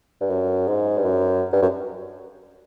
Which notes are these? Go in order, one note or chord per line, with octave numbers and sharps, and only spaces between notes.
G2
F#2
G#2
G2
F#2
G2
F#2